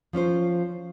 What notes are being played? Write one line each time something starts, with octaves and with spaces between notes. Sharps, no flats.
F3 C#4 F4 C5